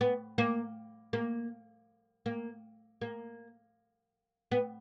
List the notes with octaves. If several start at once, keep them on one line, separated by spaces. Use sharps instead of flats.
B3
A#3
A#3
A#3
A#3
B3